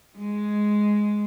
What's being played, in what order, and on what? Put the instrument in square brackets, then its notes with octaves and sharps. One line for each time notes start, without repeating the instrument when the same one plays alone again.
[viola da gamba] G#3